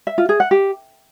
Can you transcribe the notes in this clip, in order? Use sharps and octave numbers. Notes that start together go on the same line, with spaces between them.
E5
F4
G#4
F#5
G4